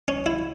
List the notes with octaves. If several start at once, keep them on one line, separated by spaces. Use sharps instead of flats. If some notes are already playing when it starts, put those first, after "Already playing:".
C#4
E4